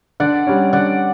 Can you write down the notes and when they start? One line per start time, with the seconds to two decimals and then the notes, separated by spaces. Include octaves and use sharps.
0.20 D3 D5 F#5
0.47 G3 C#4
0.73 D3 D5 F#5